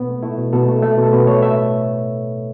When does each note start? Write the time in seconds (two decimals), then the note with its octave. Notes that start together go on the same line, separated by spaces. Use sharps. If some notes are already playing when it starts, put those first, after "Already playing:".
Already playing: B2 B3
0.09 A3
0.23 A3 E4
0.38 B2
0.53 B2 A4
0.68 A3
0.83 A3
0.98 B2 A4
1.13 B2 B4
1.27 A3 C#5
1.42 A3 E5